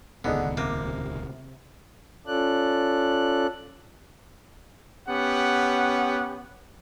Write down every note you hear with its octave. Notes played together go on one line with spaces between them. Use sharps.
D#1 C#2 D3 D#3 B3 D#4 G#4
C3 A#3
C#4 F4 A4 D5 F#6
B3 C#4 G4 F#5